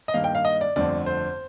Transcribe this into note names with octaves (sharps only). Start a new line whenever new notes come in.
D#5
G2 D#3 A#3 F5
G5
F5
D#5
D5
G1 F2 D3 A3 C4 D5
C5